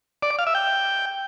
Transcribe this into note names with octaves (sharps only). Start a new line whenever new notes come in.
D5
D6
F5
E5
G5